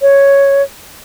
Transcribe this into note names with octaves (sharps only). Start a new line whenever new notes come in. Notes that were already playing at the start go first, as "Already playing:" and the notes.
C#5